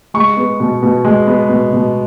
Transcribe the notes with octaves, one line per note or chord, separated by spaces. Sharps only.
G#3 C#6
B3
B2
B2
G#3
B3
B2
B2